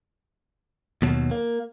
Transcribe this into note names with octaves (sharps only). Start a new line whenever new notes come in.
D#2 B2 F#3
A#3